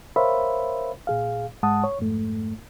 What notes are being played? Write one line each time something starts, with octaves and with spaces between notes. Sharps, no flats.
A#4 C5 C#5 E5 F5 B5
A#2 G#4 F5
G#2 G#3 F#5 A5 D#6
C#5
F2 G#2 A3